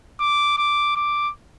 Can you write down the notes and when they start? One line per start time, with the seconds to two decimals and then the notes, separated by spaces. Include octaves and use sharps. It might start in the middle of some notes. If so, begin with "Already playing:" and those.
0.20 D6
0.58 D6
0.96 D6